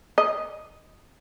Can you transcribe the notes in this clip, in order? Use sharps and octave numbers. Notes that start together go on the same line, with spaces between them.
D#5